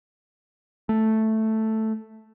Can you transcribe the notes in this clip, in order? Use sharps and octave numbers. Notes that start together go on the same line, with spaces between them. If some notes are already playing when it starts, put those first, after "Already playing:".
A3